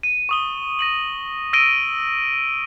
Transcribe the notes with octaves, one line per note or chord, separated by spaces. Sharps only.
D#7
C#6 D#6 G7
A#6 D#7 F#7
E6 A#6 D7 D#7 G7